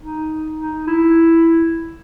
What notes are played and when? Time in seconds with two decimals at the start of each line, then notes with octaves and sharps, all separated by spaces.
0.01 D#4
0.59 D#4
0.87 E4